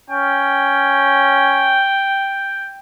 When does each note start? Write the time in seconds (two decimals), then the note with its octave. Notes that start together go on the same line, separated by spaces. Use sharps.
0.10 C#4 G5